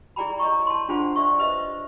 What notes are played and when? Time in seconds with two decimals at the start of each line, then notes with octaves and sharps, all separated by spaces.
0.16 E4 G#4 D5 G5 A#5 B5
0.39 C#5 D#5 A#5 C#6
0.67 A5 C6
0.89 D4 F4 G#4 C5 F#5
1.16 D5 E5 C#6
1.39 B4 C5 D#5 E5